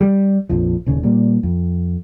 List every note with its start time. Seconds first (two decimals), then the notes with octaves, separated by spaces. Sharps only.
0.01 G3
0.49 A#1 F2 F3
0.86 D#1 C#3
1.03 A#2 G3
1.43 F2